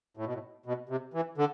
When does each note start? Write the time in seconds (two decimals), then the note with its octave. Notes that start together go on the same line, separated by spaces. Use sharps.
0.17 A2
0.26 B2
0.33 A2
0.66 B2
0.89 C3
1.14 E3
1.38 D3